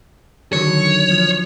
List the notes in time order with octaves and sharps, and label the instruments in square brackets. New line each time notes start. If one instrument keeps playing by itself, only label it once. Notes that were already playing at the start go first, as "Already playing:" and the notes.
[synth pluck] D3 D#3 F#3 [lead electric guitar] C#5
[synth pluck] F3